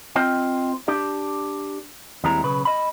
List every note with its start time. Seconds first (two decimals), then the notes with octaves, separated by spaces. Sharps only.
0.16 C4 F4 C5 D#5 G5
0.88 D4 G4 D5
2.24 D#2 G3 G#3 C4 E4 A#5
2.44 B1 C#3 B4
2.65 D#5 B5